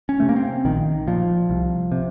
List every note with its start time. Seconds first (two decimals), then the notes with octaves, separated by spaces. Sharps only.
0.09 C#4
0.20 C3 A3
0.29 A#3
0.36 C4
0.65 A#1 D#3
1.07 A#2 F3
1.50 C2
1.92 C3